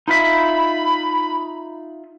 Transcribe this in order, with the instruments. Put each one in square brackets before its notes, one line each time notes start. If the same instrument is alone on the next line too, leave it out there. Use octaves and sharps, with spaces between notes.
[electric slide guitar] D#4 F4 E5 [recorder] B5